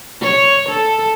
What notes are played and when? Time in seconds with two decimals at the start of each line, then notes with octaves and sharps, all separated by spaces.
0.22 C#5
0.69 A4